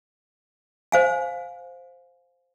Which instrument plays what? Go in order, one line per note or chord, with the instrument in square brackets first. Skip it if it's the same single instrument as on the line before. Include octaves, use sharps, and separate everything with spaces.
[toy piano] C5 F5 G#5